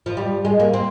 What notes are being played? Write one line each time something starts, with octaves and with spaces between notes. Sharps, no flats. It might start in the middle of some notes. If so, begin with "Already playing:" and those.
F3
G3
G#3
A#3
C4